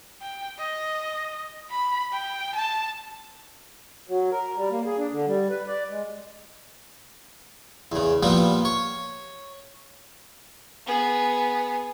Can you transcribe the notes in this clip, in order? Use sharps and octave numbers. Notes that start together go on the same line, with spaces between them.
G5
D#5
B5
G5
A5
F#3
A#4
G3
A#3
G#4
D4
D3
G3
B4
D5
G#3
E2 C#3
A#2 F3 G3 A#3 B3
C#5
B3 G#4